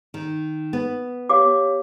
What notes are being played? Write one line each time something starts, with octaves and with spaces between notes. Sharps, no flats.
D#3
B3
G4 C#5 F5 D6